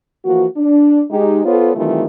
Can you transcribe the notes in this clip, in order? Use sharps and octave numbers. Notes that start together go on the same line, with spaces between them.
E3 F3 A#3 F#4
D4
G#3 D#4 G4
B3 F4 A4 C5 C#5
D#3 E3 G3 A3 C4 F4